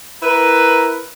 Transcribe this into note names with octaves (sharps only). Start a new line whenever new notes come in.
E4 A#4 B4